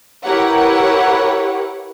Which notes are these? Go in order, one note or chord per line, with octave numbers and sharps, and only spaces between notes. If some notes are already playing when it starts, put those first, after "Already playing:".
E4 G4 A#4 B4 C#5 F#5